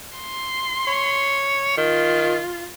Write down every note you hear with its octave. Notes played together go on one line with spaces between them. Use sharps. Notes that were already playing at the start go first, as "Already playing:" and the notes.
C6
C#5
D#3 F4